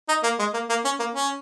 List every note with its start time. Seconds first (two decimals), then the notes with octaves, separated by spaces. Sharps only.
0.09 D#4
0.24 A#3
0.39 G#3
0.54 A#3
0.70 A#3
0.85 C#4
1.00 A#3
1.15 C#4